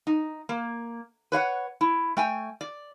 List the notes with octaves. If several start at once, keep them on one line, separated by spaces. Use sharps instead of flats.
D#4
A#3
B4 C#5 F5 F#5
E4
A3 G5 G#5
D5